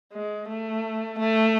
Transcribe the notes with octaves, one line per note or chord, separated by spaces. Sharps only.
G#3
A3
A3